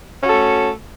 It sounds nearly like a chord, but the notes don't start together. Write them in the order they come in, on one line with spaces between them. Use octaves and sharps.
C#4 F#4 A4 A3